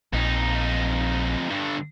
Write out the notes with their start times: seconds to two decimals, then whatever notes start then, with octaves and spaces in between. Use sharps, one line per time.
0.13 A#1 F2 D#4
1.50 G2 D3